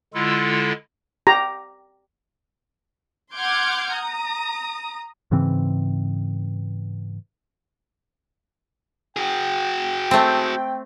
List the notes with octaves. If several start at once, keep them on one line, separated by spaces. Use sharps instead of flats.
D3 G#3 E4 F4 A4
G4 A#5
F#5 C6 D6 F6 G6 G#6
A#5 D#6
G#2 C#3 E3 C4
F#4 G#4 G5
A3 C4